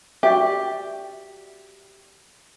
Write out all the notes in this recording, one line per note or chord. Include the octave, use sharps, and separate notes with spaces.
F#4 G4 D5 E5